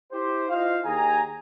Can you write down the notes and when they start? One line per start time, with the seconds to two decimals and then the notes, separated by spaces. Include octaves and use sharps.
0.13 E4 G4 C5
0.49 E4 F4 C5 D#5 F5
0.85 D#2 G#4 G#5 A#5